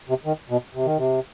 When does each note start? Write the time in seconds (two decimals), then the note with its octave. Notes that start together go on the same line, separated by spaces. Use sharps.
0.09 C3
0.25 D#3
0.50 B2
0.75 C3
0.86 D#3
0.98 C3